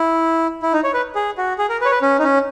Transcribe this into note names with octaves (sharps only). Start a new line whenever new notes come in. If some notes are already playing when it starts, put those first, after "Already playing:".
Already playing: E4
E4
D#4
C#5
B4
G#4
F#4
G#4
A#4
B4
C#5
B4
C#4
D#4
C#4